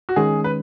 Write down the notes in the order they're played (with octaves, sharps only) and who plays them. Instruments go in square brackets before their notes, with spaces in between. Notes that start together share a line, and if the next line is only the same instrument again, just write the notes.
[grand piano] F#4
[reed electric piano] D#3 G#3 C#4 [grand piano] G#4
[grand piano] B4